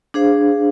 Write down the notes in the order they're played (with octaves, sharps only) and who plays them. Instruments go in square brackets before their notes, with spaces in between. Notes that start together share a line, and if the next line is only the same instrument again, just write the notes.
[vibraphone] D4 G#4 C5 F5